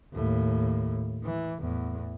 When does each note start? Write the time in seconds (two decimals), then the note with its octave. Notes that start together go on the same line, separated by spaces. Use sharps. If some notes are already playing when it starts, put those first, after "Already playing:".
0.14 D#2 A2
1.24 E3
1.60 E2 A2